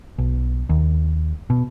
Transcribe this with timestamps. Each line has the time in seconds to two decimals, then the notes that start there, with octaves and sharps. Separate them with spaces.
0.18 B1
0.69 D#2
1.50 B2